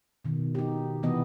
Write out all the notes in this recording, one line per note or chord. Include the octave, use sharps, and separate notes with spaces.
B2 D#3
D#4 G4
C3 E3 B3 D#5